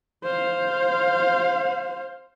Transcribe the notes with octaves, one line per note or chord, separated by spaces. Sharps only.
C5 F5